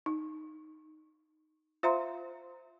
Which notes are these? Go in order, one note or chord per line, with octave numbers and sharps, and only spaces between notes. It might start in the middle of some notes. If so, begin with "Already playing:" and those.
D#4
F4 C5 E5 F5 A#5 C6